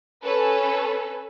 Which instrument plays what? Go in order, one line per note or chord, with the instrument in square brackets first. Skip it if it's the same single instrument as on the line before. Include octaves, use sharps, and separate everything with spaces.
[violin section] C#4 A4 B4